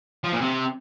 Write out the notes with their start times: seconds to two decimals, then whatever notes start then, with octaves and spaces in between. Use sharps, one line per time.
0.24 F3
0.32 A#2
0.41 C3